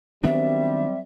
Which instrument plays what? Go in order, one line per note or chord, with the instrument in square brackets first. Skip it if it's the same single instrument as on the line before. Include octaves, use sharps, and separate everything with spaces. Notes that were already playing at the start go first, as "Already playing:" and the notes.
[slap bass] D#3 B3 D4 [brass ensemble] F#3 G3 C4 [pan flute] E5